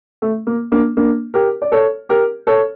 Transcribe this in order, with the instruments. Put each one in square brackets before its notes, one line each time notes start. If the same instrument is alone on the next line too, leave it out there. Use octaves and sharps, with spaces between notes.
[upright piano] A3
A#3
A#3 D4
A#3 D4
G4 A#4
D5
A4 C#5
G4 A#4
A4 C#5